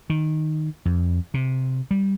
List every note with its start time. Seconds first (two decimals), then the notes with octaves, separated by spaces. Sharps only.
0.10 D#3
0.85 F2
1.34 C3
1.91 G3